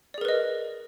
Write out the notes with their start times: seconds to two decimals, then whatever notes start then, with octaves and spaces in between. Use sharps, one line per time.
0.14 D5
0.18 G#4
0.21 A#4
0.25 B4
0.29 D#5